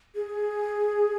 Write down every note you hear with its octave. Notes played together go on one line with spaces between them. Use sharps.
G#4